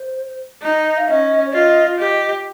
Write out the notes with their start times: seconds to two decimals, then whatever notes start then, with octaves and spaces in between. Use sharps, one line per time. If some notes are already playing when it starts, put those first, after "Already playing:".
Already playing: C5
0.63 D#4 D#5
0.97 F5
1.08 C#4 D#5
1.46 C#5
1.53 F4 D#5
1.99 G4 D#5